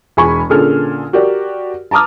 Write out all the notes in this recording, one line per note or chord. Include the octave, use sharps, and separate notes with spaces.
E1 G#4 G#5 B5 C#6
A#2 D3 C#4 G#4 A4 F6
F#4 G4 A#4 D5
A5 A#5 D6 D#6 F6